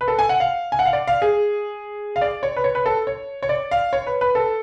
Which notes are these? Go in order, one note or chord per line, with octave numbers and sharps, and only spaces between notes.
B4
A4
G#5
F#5
F5
G#5
F#5
F5
D5
F5
G#4
F5
D5
C#5
B4
C#5
B4
A4
C#5
C#5
D5
F5
C#5
B4
B4
A4